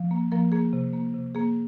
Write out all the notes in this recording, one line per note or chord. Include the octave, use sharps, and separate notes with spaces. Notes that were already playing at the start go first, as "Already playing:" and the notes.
Already playing: F3
A#3
F3 A#3 A#4
A#3 G#4
C3
A#3
C3
A#3 G#4